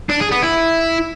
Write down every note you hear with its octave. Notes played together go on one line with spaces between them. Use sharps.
D4
G#4
B3
E4